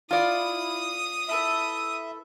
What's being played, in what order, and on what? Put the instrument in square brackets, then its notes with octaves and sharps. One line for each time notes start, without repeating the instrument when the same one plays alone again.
[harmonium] E4 [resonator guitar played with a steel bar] F4 D5 [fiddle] D#6
[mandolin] E4 A4 B4 [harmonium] E5